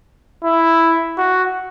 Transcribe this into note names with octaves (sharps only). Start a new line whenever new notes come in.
E4
F#4